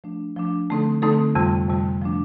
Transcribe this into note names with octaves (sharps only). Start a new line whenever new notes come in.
F3 A3 D4
F3 A3 D4
D3 A3 C4 D#4 A4
D3 A3 C4 D#4 A4
F2 C3 G3
F2 C3 G3
F3 A3 D4